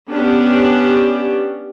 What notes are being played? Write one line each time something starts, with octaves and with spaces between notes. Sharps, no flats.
B3 C#4 D4 G4